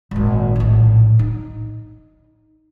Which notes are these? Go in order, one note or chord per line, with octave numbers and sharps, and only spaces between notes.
G#1 A#2
A#1 A2
D#4